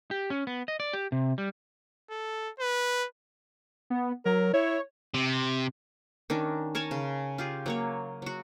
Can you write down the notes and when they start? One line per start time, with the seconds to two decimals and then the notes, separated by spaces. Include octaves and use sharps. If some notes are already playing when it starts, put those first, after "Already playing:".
0.11 G4
0.30 C#4
0.47 B3
0.68 D#5
0.80 D5
0.93 G4
1.12 C3
1.38 G3
2.10 A4
2.60 B4
3.90 B3
4.26 F#3 A#4
4.54 E4 C#5
5.14 C3
6.30 D#3 C#4 D4
6.75 A#4 C#5 G#5 A5
6.91 C#3
7.38 F4 G4 G#4
7.66 F#3 A#3 C#5
8.22 F#3 F#4